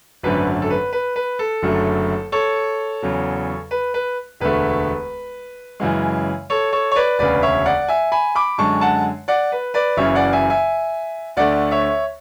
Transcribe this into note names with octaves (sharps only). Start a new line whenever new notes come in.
G#1 F#2 D3 A3 B4
A4
B4
B4
B4
A4
F#1 F#2 D3 F#3 A3
A4 C#5
E2 C#3 F#3
B4
B4
E1 D2 D3 A3 B4
F#2 C#3 E3 G#3
A4 C#5
A4 C#5
C#5
B4 D5
E1 D2 C#3 B4 D5
C#5 E5
D5 F#5
E5 G#5
G#5 B5
B5 D6
F#2 D3 G#3 A5 C#6
F#5 A5
D5 F#5
B4
B4 D5
F#1 F#2 C#3 E3 C#5 E5
D5 F#5
E5 G#5
E5 G#5
D2 D3 A3 D5 F#5
C#5 E5